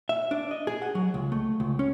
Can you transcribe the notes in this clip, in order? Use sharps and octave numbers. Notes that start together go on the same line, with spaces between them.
E5
D4
D#5
G#4
F#5
F#3
C#2
A3
C#2
C#4